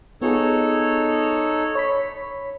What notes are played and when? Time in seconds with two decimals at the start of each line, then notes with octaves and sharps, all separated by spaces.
0.22 B3 D#4 F4 G#4 A4 C#5
1.75 C#5 B5 B6